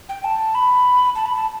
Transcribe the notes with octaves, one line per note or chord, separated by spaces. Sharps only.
G5
A5
B5
A5
B5
A5